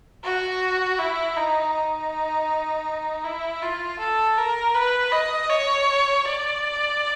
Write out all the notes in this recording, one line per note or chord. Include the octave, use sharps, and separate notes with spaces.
F#4
E4
D#4
D#4
E4
F4
A4
A#4
B4
D#5
C#5
D5